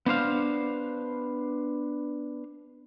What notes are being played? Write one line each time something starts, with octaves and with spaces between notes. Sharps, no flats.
B3 D4 C5 F5